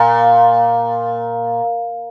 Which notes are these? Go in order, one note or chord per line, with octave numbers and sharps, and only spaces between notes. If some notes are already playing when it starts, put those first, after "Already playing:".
Already playing: A#2